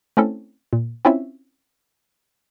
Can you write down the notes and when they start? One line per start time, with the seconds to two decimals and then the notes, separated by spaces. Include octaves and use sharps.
0.17 A3 C4 C#4 E4 A4
0.73 A#2
1.05 C4 C#4 E4 F4 C#5 E5